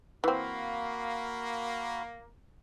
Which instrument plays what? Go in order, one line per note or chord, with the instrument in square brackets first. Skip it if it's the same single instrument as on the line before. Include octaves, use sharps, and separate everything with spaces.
[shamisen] E3 C4 [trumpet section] A#3 [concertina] F#4 F5 B5